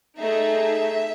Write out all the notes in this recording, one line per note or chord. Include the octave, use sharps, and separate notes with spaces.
A3 D#4 G#4 E5